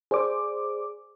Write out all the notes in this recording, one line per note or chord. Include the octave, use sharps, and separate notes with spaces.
G#4 C5 D5 D6